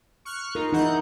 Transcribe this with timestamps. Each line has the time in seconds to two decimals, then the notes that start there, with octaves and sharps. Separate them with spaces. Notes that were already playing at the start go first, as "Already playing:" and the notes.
0.25 C#6 F6 F#6
0.55 D#4 F4 A#4
0.73 E3 D#4 F#5 G6